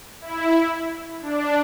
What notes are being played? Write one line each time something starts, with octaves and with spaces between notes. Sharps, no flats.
E4
D4